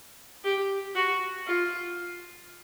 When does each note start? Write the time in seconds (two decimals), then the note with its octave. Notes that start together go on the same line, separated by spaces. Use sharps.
0.44 G4
0.95 F#4
1.46 F4